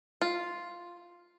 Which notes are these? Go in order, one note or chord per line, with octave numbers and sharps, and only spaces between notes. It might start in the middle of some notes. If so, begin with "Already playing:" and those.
F4